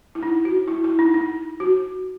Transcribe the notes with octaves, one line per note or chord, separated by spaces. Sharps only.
E4
D#4
F#4
E4
E4
D#4
D#4
F#4